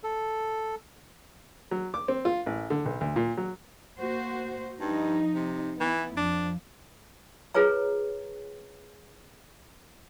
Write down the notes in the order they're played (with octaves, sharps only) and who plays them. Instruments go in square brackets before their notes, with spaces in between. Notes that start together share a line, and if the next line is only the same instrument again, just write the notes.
[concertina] A4
[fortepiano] F#3
D6
C4
F4
A1
D3
B1
D2
A#2
F#3
[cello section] A#3 F#4 C5
[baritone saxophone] G2 [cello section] F3 D#4
[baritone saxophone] C3
[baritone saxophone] E3 [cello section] B3 E4
[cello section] F2 F3 [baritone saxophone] D4
[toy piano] F4 G#4 B4 C#5 A#5